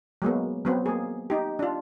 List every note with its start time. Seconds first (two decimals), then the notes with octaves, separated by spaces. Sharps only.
0.22 F#3 G#3 A#3 B3
0.65 F#3 B3 C4
0.86 A#3 G#4
1.30 D#4 G4
1.59 D4 F4